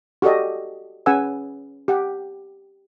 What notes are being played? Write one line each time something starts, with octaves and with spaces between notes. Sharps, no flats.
F#4 G4 A4 D5 D#5
C#4 G#4 B4 F#5 G#5 E6
G4 F#5